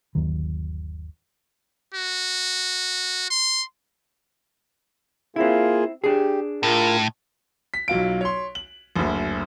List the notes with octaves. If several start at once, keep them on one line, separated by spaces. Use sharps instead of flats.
G1 D#2 D#3 F#3
F#4
C6
A#3 C4 E4 F4 G#4
D4 G4 G#4
A2 F4 A#4
B6
B1 F#3 F4 D7
C#5 C6
F#7
F#1 D2